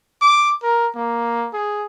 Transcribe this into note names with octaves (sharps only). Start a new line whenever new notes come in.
D6
A#4
A#3
G#4